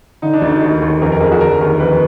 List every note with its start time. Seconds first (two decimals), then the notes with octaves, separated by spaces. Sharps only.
0.22 D3 D#4
0.34 D4
0.42 D2 D#4
0.61 D#2 D#4
0.82 D#2
1.02 F2 A#4
1.12 A#4
1.20 F2 G#4
1.32 F#4
1.41 D3 A#4
1.61 D#2 A#4
1.80 F2 B4